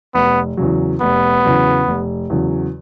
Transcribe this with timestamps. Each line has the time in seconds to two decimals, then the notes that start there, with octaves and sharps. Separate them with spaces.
0.15 F1 B3
0.57 E2 C#3 F#3
1.01 F1 B3
1.45 E2 C#3 F#3
1.88 F1
2.30 E2 C#3 F#3